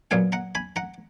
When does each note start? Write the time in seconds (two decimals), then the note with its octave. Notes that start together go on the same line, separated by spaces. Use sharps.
0.11 A#2 F#3 B3 F5 G#5
0.32 F#5 A#5
0.55 G#5 B5
0.76 F#5 A#5